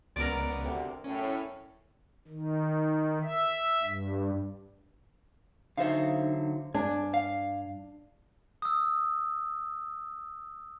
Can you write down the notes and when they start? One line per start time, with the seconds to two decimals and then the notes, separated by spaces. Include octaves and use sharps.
0.16 C#2 B3 A#4 D5
0.63 D2 C3
1.04 F#2 A2 C#4
2.28 D#3
3.23 E5
3.83 G2
5.78 D3 F#3 D#4 C5 E5 F5
6.74 G2 D4 G#5
7.14 F5
8.62 D#6 E6